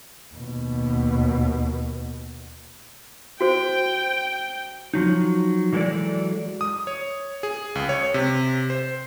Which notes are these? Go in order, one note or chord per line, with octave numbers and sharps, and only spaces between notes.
D#2 B2
F#4 C5 G5
F3 F#3 D#4
E3 F#3 G#3 G#4 A4 D5
D#6
C#5
G#4
C#2
C#5
C3
C5